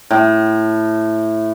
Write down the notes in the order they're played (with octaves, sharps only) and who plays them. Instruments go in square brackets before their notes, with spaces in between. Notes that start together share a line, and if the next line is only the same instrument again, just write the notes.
[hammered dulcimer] A2